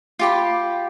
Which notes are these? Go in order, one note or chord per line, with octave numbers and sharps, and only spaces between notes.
F4 G4 B5